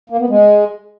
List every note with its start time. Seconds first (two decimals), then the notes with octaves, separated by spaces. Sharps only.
0.10 A#3
0.20 B3
0.29 G#3